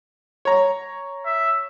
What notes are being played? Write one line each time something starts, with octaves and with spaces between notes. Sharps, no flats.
C#5 A#5
E5